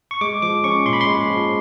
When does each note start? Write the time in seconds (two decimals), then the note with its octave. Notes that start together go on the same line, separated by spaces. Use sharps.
0.11 C#6
0.21 G#3 D6
0.42 F3 D6
0.64 C#4 C#6
0.85 A#2 C6
0.93 B5
1.01 C6
1.07 G#3
1.29 F3